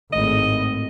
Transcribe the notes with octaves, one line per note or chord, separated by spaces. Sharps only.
G#1 A2 D#5